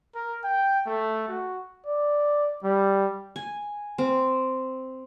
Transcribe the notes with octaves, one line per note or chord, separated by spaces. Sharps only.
A#4
G5
A3
F#4
D5
G3
G#5
C4